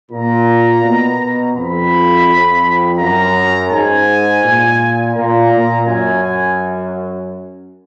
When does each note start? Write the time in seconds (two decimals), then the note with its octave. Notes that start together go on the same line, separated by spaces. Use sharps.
0.11 A#2 A#5
0.84 B2
1.55 F2 B5
2.27 F2
2.99 F#2 A#5
3.71 G#2 G#5
4.44 A#2
5.15 A#2 A#5
5.52 A#2
5.87 F#2 G#5
6.23 G#5